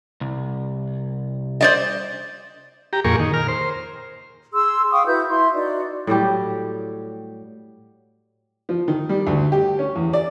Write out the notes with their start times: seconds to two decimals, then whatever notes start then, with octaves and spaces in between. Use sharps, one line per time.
0.21 C2
1.61 C5 D5 D#5
2.93 G4 A#5
3.05 F2 A#2 G#4 A#4 C#6
3.20 D#3
3.34 A#4 F6
3.48 C5
4.52 G#4 C6 E6
4.90 F5 G5 C#6 D#6
5.06 E4 F#4 B4 G6
5.29 E4 C6
5.54 D#4 F#4 D5
6.07 A2 F#3 G3 G4
8.69 F3
8.88 D#3
9.09 G3
9.27 D2
9.52 G4
9.79 C#4
9.96 E2
10.13 D5